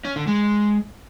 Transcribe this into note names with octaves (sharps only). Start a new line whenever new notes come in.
C#4
D3
G#3